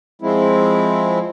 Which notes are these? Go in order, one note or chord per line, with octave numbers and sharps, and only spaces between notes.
F3 G#3 C4 E4